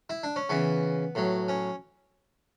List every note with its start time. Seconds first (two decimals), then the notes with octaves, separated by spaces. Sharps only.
0.10 E4
0.23 D4
0.36 C#4
0.49 C#3 E3 B3
1.15 A2 F#3
1.48 C#4